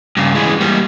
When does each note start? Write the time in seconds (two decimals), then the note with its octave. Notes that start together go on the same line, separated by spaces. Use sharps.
0.17 G2 C#3
0.35 E3 G#3
0.61 G3 A#3